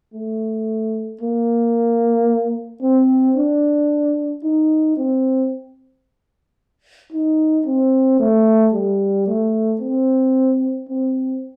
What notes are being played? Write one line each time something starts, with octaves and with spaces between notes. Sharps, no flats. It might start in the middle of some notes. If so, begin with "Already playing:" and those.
A3
A#3
C4
D4
D#4
C4
D#4
C4
A3
G3
A3
C4
C4